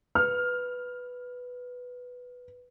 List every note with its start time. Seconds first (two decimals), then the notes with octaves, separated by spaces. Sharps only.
0.15 B4 F6